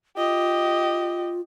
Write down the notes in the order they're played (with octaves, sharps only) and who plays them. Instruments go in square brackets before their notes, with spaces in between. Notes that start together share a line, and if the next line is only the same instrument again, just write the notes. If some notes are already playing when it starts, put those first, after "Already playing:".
[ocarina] F4 [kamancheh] G4 D#5